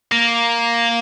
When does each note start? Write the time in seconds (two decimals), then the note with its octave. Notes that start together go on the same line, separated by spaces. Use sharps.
0.12 A#3